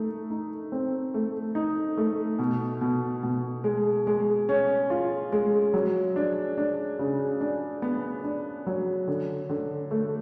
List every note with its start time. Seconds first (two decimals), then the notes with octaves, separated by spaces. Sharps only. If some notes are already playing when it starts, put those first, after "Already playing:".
Already playing: A3 D#4
0.30 D#4
0.72 C4
1.14 A3
1.55 D#4
1.97 A3
2.39 B2
2.81 B2
3.23 B2
3.64 G#3
4.07 G#3
4.49 C#4
4.90 F4
5.32 G#3
5.74 F#3
6.16 D4
6.58 D4
6.99 C#3
7.41 D4
7.82 B3
8.24 D4
8.67 F#3
9.08 D3
9.49 D3
9.91 A3